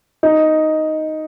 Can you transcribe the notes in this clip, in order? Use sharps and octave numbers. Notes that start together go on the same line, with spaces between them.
D#4